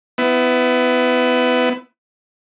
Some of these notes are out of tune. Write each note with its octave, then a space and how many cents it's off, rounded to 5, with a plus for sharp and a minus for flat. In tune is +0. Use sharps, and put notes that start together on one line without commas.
B3 +20 E4 +0